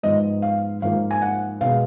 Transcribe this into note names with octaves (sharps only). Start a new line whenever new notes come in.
G#2 F3 B3 D#5
F5
G#2 F3 A#3 F5
G#5
F#5
B2 G#3 B3 F5